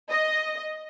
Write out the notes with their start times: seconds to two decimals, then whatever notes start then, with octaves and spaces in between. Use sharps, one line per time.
0.10 D#5